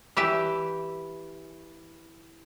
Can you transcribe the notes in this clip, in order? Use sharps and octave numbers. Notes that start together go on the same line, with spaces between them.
E3 G4 E5